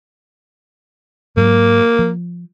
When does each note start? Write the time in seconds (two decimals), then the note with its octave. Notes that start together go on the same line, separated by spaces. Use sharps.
1.37 G#2 F#3 A#3
1.99 F3